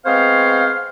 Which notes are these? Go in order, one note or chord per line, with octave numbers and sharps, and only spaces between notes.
G#3 B3 C4 C5 C#5 F5